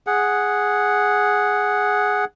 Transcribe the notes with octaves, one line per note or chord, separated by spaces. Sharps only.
G#4 F#5